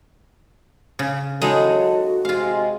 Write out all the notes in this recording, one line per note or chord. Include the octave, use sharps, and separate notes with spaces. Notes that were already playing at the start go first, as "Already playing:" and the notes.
C#3
C#3 F#3 G#3 D#4 E4 F#4 A4
C3 G#3 F4 F5